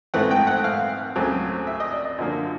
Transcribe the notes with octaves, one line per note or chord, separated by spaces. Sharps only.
G#2 E3 A3 C4 F#5
G5
F#5
F5
C#2 C#3 F#3 A3 C4
E5
D#5
D5
D#5
F#2 D3 F3 A#3